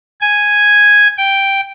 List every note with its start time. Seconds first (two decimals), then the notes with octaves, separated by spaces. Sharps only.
0.21 G#5
1.17 G5